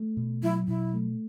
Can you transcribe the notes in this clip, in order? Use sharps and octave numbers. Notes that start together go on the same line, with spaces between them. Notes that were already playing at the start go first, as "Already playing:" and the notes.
Already playing: A3
B2
F#3 E4
B2 E4
A3